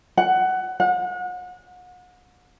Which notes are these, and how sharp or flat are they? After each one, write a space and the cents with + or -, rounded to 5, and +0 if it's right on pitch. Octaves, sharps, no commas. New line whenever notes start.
F#5 +15
F#5 -35